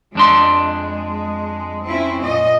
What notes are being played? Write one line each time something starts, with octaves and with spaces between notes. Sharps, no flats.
F2 G#3 D4 C6
C4 C#4 E4
A#2 D#5